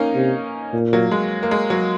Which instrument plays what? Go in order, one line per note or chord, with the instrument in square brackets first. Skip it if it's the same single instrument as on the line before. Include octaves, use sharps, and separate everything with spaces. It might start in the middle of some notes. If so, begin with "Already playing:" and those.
Already playing: [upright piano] A#3 C#4 D#4
[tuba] C3
A#2
[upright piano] F#3 A#3
G#3
A#3
G#3
F#3